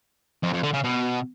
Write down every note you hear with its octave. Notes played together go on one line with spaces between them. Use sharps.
F2
F2
D3
C#3
B2